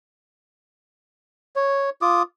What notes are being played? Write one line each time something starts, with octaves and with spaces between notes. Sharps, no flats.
C#5
F4 D6 D#6